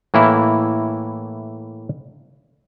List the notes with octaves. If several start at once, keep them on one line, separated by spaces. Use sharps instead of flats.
A2 E3 A#3 E4